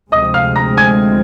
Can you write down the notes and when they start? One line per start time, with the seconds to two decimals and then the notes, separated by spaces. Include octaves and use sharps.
0.12 D2 C3 F3 G#3 C4 D#5 D#6
0.34 F5 F6
0.56 A#5 A#6
0.77 G#5 G#6